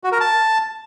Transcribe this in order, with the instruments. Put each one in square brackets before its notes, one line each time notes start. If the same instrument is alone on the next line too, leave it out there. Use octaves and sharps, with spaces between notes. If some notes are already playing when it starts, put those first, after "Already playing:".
[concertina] F#4
A#4
A5